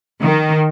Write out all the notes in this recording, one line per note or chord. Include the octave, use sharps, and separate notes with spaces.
D#3